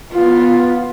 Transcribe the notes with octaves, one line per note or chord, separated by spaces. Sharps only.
B3 F4